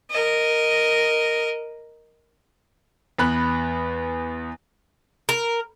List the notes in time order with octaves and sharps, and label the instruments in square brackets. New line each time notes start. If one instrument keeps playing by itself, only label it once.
[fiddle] A#4 D#5
[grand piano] E2 B3 B5 F#6
[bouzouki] A#4